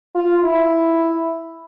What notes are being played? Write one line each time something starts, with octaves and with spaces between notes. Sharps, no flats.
F4
E4